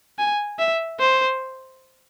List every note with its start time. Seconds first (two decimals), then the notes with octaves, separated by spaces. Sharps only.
0.19 G#5
0.59 E5
0.99 C5